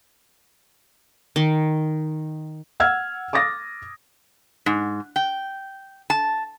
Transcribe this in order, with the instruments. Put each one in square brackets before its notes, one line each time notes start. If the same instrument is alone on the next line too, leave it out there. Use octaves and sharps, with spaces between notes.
[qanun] D#3
[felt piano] F#5 E6 F6 G#6
D6 D#6 A6 A#6
[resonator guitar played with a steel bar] G#2
G5
A5